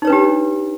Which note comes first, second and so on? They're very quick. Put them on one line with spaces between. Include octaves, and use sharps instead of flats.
D#4 C#5 B4 D4 G4